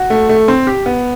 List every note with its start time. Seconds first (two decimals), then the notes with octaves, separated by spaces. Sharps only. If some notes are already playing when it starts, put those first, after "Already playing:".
Already playing: F#4
0.10 A3
0.29 A3
0.48 C4
0.67 G4
0.86 B3